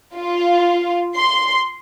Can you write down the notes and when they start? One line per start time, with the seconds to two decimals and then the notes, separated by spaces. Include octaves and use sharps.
0.15 F4
1.16 C6